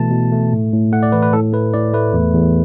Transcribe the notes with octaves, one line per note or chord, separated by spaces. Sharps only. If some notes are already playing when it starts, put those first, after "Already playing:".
Already playing: B2 E3 A3 A5
B2
A3
A2
A2
A3 F#5
D5
E3 B4
B4
A2 A4
A3 B4
A2 D5
A3 B4
E2
E2